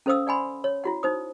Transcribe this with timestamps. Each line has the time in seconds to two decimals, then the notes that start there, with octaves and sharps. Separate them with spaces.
0.06 C#4 A4 C5 F5 D#6 E6
0.27 D5 F#5 G#5 B5 C6
0.64 C#5
0.84 E4 F#4 F#5
1.03 D#4 C5 D#6